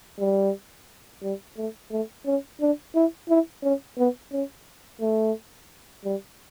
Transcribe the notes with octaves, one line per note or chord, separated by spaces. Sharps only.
G3
G3
A3
A3
C#4
D4
E4
E4
C#4
B3
C#4
A3
G3